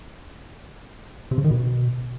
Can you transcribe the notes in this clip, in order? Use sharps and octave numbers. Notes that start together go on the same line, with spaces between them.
C3
C#3
D#3
B2